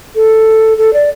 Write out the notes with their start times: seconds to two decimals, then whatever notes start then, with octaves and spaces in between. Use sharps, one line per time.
0.15 A4
0.78 A4
0.93 D5